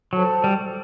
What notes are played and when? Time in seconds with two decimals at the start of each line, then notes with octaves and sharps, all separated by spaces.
0.13 F#3 A4 C5 F#5 A5
0.44 G3